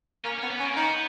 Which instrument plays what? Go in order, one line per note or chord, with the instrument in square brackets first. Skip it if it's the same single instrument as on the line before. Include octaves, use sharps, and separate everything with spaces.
[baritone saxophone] A#3 [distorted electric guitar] C#4
[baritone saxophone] B3 [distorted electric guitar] C#4
[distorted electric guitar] B3
[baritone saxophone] C#4
[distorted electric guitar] A#3
[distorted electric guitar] B3 [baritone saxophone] D#4